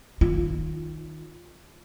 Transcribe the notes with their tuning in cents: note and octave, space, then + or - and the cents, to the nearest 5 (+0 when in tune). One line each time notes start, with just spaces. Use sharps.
D#3 +0 F4 +0